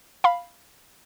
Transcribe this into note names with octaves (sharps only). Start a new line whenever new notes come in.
F5 B5